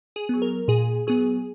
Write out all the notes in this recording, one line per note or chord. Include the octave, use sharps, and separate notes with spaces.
G#4
F#3 B3
A#4
A#2 G#4
F#3 B3 G#4